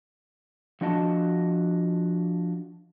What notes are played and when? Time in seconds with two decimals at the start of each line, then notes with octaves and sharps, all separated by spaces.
0.81 F3 D4 F#4 D#5 F#5 A5